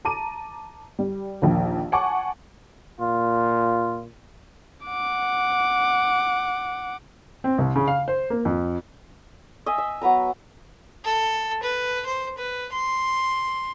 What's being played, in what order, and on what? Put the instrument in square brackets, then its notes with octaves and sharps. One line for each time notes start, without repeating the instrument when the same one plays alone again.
[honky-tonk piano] A5 A#5 D6 D#7
G3
A#1 D#2
F#5 G#5 A5 C#6 D6
[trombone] A#2 [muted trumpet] F4
[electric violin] F#5 D6
[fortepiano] C4
C2
C#3
F5
C5
A#3
F2
[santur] D#5 E5 G#5
E5
F#3 B3 B4 A#5
[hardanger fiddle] A4
B4
C5
B4
C6